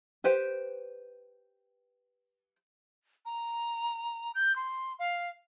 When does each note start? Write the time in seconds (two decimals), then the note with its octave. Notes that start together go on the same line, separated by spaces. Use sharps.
0.24 G4 B4 C5 G5
3.25 A#5
4.35 G6
4.56 C6
4.99 F5